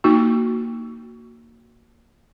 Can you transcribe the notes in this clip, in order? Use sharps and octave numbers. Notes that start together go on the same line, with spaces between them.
A#3 D#4 F#4